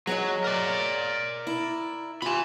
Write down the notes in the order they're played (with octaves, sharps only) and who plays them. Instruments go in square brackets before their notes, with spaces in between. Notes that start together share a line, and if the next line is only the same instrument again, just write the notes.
[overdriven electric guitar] F#3 [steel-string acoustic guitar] G#4 C#5 D#5
[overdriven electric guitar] A#4 D5
[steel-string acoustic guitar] E4
[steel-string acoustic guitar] F4 G4 [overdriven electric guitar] G#5 B5